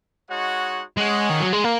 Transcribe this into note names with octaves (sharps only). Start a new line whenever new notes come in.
G#3 D#4 F#4 C#5 F#5
G#3 C#4 G#4 C#5 F#5
D#3
F#3
G#3
A#3